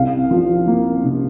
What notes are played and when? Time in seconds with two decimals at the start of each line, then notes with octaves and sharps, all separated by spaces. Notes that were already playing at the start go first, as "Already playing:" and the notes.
Already playing: C2 F5
0.31 F3
0.67 A#3
1.04 C3